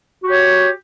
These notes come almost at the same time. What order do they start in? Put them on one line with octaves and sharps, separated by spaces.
F#4 G4 C#5